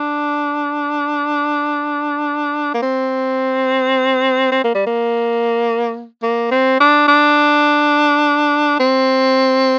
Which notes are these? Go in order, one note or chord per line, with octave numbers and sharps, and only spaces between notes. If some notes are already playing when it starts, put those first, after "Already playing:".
Already playing: D4
A#3
C4
C4
A#3
G3
A#3
A#3
C4
D4
D4
C4